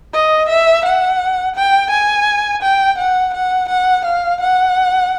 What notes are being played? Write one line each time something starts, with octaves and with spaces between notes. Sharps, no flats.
D#5
E5
F#5
G5
G#5
G5
F#5
F#5
F#5
F5
F#5